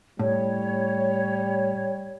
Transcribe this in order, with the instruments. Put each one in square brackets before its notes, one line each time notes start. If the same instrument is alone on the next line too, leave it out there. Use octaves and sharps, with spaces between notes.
[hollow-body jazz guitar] A2 [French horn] G3 [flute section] C#5